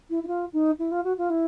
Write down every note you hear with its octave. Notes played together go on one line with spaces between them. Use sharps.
E4
E4
F4
D#4
E4
F4
F#4
F4
E4